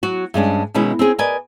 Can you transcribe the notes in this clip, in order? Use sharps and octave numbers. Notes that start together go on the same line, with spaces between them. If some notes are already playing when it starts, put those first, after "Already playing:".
F#3 F#4
G2 G#3 C#4 D4
B2 D#3 G#3 C#4 E4
C4 C#4 G#4
A#4 B4 D5 D#5 G#5